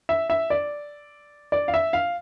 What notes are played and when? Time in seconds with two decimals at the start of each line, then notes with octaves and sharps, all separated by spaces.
0.09 E5
0.30 E5
0.50 D5
1.52 D5
1.68 F5
1.74 E5
1.93 F5